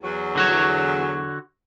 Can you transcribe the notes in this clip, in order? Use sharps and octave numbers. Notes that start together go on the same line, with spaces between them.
E2 F#3
D3 F#4 C#5